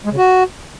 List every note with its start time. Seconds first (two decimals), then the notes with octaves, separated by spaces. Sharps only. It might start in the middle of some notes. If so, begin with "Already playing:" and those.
0.05 G#3
0.11 C#3
0.17 F#4